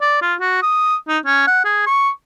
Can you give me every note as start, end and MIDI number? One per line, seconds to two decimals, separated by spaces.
0.01 0.18 74
0.22 0.35 65
0.40 0.58 66
0.62 0.96 87
1.08 1.19 63
1.25 1.47 61
1.47 1.62 78
1.65 1.82 68
1.86 2.10 85